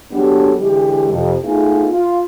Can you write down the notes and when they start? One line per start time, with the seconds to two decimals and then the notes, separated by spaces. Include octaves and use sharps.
0.12 F#3 G#3 B3 D4 G4 A4
0.58 D3 E3 G#3 G4
1.11 F2 C3
1.43 A3 B3 D#4 F4 G#4
1.91 F4